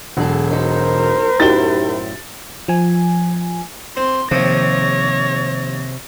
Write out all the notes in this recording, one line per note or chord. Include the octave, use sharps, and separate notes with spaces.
E1 F#3 G#4 A4
F#3 D#4 A4 A#4 C5
F#2 A2 D#4 E4 F#4 G4 A6 G7
F3 G#5
C4 C6
D#2 C3 F3 C#5 A#6